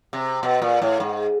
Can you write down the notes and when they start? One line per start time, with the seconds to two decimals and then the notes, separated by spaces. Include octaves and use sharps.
0.13 C3
0.43 B2
0.62 A#2
0.82 A2
1.00 G#2